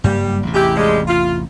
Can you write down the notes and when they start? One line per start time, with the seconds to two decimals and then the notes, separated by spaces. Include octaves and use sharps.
0.04 F#1 G2 G3 A#3
0.43 A1 E2 C3
0.54 G#3 E4 G4
0.76 F3 G3 G#3
1.07 F4